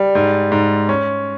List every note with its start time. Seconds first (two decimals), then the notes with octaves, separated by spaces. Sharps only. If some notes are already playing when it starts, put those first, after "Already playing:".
Already playing: G3
0.15 G#2
0.52 G#2
0.89 C#4